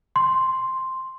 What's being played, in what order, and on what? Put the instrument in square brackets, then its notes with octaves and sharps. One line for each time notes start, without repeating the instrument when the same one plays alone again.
[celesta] C6